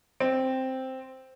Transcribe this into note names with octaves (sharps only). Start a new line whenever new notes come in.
C4